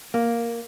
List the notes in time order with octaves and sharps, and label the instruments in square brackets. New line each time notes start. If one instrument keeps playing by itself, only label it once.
[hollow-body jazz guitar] A#3